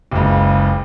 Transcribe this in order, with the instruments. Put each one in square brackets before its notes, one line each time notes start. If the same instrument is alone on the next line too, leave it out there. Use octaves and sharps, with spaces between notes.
[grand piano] F#1 C#2